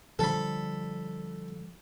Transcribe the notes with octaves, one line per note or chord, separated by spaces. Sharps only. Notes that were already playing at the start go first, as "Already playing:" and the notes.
D3 F3 G3 A4 B5